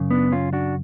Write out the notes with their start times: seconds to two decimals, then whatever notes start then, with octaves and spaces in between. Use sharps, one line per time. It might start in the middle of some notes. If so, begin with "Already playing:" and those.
Already playing: F#2 C#3
0.11 B3 D4
0.32 C#4 F4
0.53 D4 F#4